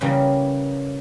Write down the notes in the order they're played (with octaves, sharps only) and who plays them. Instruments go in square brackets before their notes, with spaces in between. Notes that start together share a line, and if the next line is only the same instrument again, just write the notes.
[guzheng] C#3 E3 G3 A#3 F#4 A#4